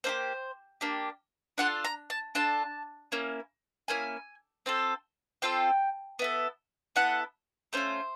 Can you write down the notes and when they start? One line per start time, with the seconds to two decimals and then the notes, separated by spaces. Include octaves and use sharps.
0.04 A#3 D4 G4 C5
0.81 A#3 D4 G4
1.58 D4 F4 A4 F#5
1.85 A#5
2.10 A5
2.35 D4 F4 A4 A5
3.12 A#3 C#4 E4
3.88 A#3 C#4 E4 G#5
4.66 C4 F4 A4
5.42 C4 F4 A4 G5
6.19 B3 E4 A4
6.96 B3 E4 A4 F#5
7.73 A3 C#4 F4 C5